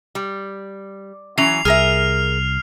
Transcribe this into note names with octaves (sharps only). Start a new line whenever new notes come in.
G3
E3 F#3 C#4 C7 F7
C2 G#4 A#4 E5 F6